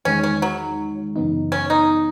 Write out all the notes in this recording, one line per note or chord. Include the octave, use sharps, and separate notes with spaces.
E2 D#3 G#3 C#4 D#4
C#4
F#3
F#2 C#3 E3 B3 D#4
C#4
D#4